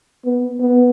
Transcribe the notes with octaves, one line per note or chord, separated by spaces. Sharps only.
B3
B3